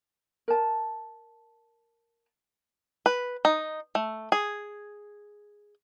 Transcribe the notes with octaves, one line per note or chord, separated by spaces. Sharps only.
A#4 A5
B4
D#4
A3
G#4